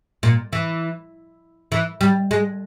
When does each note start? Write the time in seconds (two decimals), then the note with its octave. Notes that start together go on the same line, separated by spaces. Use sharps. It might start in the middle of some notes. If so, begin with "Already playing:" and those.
0.23 A#2
0.53 E3
1.72 E3
2.01 G3
2.31 G#3